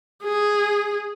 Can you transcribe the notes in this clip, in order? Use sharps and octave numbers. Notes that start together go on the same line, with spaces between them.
G#4